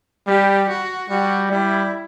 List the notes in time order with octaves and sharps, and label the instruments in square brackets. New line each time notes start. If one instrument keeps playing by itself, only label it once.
[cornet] G3 [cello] G4
[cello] F#4
[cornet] G3 [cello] F#4
[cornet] G3 [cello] E4